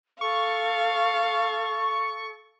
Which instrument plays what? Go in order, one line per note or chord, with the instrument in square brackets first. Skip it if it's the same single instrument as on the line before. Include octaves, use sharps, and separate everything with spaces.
[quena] A4 [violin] F5 [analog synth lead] C#6